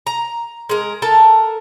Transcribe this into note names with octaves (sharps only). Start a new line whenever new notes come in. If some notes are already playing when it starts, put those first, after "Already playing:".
A#5
G#3 A#4
A4 A#4 A5